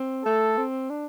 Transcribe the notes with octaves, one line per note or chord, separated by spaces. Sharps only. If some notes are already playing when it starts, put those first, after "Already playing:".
Already playing: C4
A3 A4
C4
D4